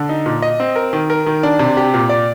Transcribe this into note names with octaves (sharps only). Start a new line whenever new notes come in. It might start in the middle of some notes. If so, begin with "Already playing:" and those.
Already playing: D3
D#4
A#2
D#5
C4
A#4
D#3
A#4
D#3
D4
C3
G4
A#2
D5